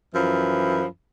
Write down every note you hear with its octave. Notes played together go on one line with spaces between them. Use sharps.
F#2 E3 F3 B5